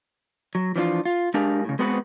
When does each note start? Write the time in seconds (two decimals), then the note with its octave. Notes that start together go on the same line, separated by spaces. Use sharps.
0.55 F#3
0.76 E3 F3 D4 F4
1.05 F4
1.34 G#3 D4 G4 G#4 A#4 F5
1.65 A2 C#3
1.79 G#3 B3 C4 F#4 B4